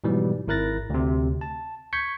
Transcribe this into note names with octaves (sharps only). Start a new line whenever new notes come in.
G#2 B2 E3 F#3 G3
G#1 E4 A#4 F#6 A6 A#6
D2 C3
A5
C#6 G6 G#6 B6 C#7